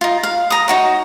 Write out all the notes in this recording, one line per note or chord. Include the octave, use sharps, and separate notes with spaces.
D#4 F4
F5
A#5 D#6
D#4 F#4 C#5